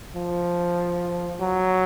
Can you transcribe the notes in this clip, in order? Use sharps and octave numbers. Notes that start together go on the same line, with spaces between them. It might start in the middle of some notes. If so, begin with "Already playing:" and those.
F3
F#3